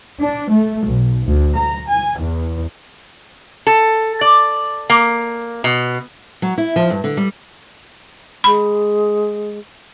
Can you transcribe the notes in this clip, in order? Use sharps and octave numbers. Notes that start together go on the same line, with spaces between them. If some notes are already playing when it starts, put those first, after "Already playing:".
D4
A3
B1
D2
A#5
G#5
E2
A4
D5
A#3
B2
F#3
E4
F3
G2
D3
G3
G#3 B5